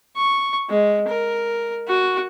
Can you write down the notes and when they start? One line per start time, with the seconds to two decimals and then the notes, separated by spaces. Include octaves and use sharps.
0.16 C#6
0.70 G#3
1.08 A#4
1.87 F#4